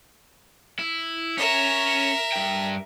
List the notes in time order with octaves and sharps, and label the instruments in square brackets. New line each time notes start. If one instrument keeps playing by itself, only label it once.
[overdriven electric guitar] E4
[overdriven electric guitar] C#4 C#5 [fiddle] A#4 E5
[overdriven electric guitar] G2 G5